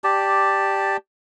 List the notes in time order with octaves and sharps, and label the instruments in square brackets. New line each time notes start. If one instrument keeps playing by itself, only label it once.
[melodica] G4 D5 A5